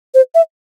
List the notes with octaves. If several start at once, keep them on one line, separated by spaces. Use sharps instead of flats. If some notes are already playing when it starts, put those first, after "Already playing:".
C5
E5